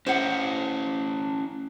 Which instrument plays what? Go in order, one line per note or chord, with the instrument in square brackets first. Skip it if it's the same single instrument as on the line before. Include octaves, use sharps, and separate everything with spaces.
[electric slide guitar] C#4 E4 [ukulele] C5 F#5